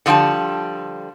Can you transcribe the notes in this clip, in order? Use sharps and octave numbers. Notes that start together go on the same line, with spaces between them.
D3 F3 G3 G5 A5